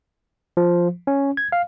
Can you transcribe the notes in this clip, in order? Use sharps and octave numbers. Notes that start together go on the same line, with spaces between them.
F3
C#4
G#6
F5